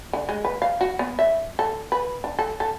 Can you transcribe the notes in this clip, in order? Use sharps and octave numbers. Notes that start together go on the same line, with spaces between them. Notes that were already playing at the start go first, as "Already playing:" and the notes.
D3
G#3
B4
F5
F#4
B3
E5
A4
B4
D4
A4
A4